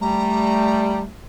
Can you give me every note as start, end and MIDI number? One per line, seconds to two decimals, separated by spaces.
0.01 1.01 55
0.01 1.12 57
0.01 1.00 82